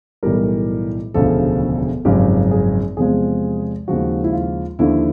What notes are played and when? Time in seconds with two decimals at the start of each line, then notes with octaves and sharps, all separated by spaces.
0.23 B1 A2 E3 G3 A#4
1.14 E1 D2 C#3 F3 A4
2.05 G#1 F#2 C#3 F3 G4
2.51 G#4
2.97 E2 C3 F3 G#3 G#4
3.88 D#2 C#3 F3 G#3 F#4
4.24 E4
4.33 F4
4.79 D#2 D3 F3 E4